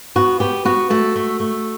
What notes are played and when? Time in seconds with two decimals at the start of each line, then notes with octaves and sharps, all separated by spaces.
0.16 B3 F#4
0.40 B3 G4
0.65 B3 F#4
0.90 A3 F#4
1.16 A3
1.40 A3